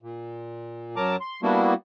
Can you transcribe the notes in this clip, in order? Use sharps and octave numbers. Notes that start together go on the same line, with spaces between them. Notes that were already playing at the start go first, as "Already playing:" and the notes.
A#2
F#2 F#3 A#4 A5 A#5 D6
C6
G3 A#3 B3 D4 E4 F#4